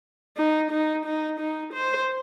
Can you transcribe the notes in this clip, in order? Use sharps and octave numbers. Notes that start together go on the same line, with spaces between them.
D#4
D#4
D#4
D#4
C5